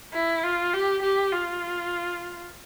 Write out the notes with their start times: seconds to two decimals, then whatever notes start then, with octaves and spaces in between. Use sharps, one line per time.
0.14 E4
0.44 F4
0.74 G4
1.02 G4
1.33 F4